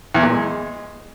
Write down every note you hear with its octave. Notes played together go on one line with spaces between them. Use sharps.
E2
A#2
G#3